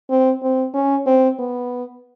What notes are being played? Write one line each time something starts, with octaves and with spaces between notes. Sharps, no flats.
C4
C4
C#4
C4
B3